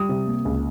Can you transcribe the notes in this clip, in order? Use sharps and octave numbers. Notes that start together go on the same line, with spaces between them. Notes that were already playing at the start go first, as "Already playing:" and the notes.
Already playing: G3 D#6
C3
A#3
C#2